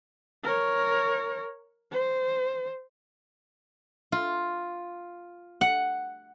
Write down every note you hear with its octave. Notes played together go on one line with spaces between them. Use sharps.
A#4 C#5
C5
F4
F#5